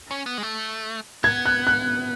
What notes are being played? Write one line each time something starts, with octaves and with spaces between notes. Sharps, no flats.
C#4
B3
G#3
A3
B3 G#6
F#6
F#6